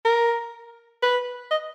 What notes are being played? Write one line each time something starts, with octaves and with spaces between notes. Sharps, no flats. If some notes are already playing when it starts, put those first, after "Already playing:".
A#4
B4
D#5